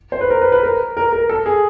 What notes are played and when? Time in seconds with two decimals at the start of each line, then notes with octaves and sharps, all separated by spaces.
0.12 C5
0.21 B4
0.30 A#4
0.41 B4
0.52 B4
0.63 A#4
0.97 A#4
1.12 A#4
1.29 A4
1.46 G#4